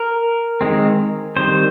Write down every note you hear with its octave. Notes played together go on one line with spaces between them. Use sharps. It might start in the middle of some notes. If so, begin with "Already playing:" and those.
Already playing: A#4
D#3 G#3 C4
D#3 G3 C4 C5